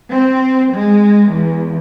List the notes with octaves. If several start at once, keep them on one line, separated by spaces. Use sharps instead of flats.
C4
G#3
E2